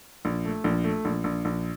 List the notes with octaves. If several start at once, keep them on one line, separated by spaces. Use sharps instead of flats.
A#1
A3
A#1
A3
A#1
A#1
A#1